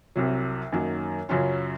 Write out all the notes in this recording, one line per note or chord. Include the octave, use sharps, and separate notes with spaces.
C2 C3 F#3
F#2 D#3 F#3 A#3
F#2 C#3 F#3 C#4 F4